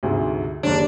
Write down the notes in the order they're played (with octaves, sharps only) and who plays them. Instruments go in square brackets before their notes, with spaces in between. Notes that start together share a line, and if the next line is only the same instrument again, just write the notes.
[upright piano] D2 G#2 C3
[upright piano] F#1 D#2 [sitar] D4